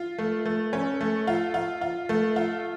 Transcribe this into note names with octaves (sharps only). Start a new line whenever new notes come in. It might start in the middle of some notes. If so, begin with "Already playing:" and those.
Already playing: F4
A3
A3
C#4
A3
F4
F4
F4
A3
F4